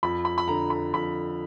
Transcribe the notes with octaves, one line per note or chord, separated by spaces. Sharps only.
F2 B5
B5
B5
D3 A#5
B5
F2 B5